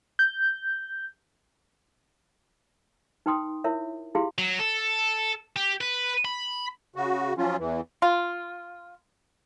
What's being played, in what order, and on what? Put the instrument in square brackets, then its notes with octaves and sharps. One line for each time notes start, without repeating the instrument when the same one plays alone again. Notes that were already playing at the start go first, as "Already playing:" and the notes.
[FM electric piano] G6
[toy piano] D#4 B4 G5 C6 D#6
E4 F4 A#4 C#5 E5
E4 F4 G4 G#4 F5 C6
[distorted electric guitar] F#3
A4
G4
B4
B5
[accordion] C#3 F#4
F3 F#3 C#4 F4
E2 E3
[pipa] F4